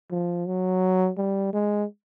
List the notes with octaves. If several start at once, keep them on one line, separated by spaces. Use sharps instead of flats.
F3
F#3
G3
G#3